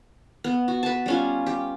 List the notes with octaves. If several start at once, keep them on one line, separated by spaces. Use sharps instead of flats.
B3
F#4
B4 A5
G3 C#4 F4
G4